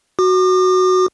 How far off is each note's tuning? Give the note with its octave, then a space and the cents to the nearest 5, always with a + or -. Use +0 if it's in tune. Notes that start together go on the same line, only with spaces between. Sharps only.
F#4 +0 D6 +40